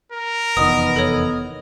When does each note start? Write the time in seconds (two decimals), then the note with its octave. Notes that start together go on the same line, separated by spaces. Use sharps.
0.13 A#4
0.57 F1 E2 D#3 B3 D#5 D#6
0.96 A4 C#5